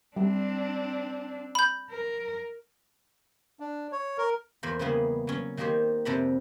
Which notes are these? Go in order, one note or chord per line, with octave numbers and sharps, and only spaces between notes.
G3 C4 D4
B5 G6
A#4
D4
C#5
A#4
E2 A#3 A#4 C5 B5
C#3 E3 G3 A#3 B3 G#4
F#3 C#4
D#3 A#3 D#4 G4 C5 C#5
F2 C3 A4 D5 A#5 B5